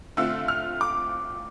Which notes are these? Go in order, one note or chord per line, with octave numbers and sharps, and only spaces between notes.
D3 A3 C4 F4 E6
F6
D6